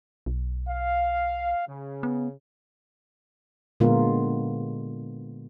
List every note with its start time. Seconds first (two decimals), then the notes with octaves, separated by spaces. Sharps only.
0.26 B1
0.68 F5
1.67 C#3
2.03 B3
3.80 A#2 D3 G#3 B3 F4 A#4